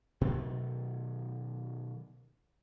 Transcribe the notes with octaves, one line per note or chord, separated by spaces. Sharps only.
B2 D#3 F#3 A3